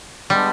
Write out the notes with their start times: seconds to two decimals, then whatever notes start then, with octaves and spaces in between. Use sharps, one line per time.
0.30 G3 G#3 B3 D4